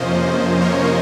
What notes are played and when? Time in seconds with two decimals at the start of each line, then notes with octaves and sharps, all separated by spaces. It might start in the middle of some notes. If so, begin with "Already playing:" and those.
Already playing: F2 C3 F3 A#3 C#4 C5 D#5
0.61 A#4 C#5